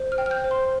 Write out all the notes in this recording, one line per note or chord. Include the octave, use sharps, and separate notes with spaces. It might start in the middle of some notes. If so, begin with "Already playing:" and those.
Already playing: C5
F6
G5
F6
G6
C5
C6